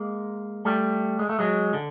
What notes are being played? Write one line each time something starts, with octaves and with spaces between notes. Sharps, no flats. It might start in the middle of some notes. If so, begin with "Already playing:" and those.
Already playing: G#3 A#3
G3 A3
G#3
A3
F#3 G#3
D3